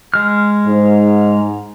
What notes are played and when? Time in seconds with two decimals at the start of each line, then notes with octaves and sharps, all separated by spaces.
0.14 G#3 F6
0.66 G#2